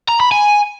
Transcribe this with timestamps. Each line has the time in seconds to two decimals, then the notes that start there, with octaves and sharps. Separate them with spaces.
0.09 A#5
0.20 B5
0.32 G#5